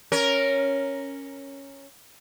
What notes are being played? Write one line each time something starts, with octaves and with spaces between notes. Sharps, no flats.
C#4 A#4